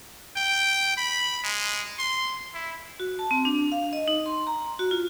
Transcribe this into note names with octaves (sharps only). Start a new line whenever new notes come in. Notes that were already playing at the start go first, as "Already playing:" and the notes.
G5
B5
G#3
C6
E4
F#4
A5
C4
D4
F5
D#5
D#4
C6
A#5
F#4
F4